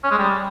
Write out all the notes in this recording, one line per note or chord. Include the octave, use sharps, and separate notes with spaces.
C#4
G#3
G3